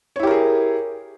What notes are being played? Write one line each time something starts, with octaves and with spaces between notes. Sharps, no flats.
E4 G4 G#4 A#4 C#5